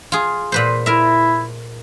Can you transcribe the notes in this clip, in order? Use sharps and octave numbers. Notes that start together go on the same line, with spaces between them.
F4 G#4
A#2 B4 C5
E4 A#4 E5